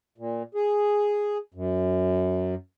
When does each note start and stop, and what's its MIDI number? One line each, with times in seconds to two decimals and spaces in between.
0.18 0.43 46
0.55 1.38 68
1.54 2.55 42